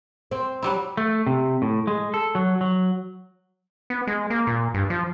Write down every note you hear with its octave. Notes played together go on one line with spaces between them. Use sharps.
C4
F#3 G3 E4
A3
C3
A2
G#3
A4
F#3
F#3
B3
G#3
A#3
A#2
G2
F3